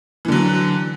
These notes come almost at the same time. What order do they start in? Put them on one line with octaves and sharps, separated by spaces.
E3 D3 F#3